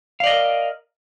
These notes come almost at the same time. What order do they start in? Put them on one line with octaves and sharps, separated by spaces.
F5 D5 D#5 A#4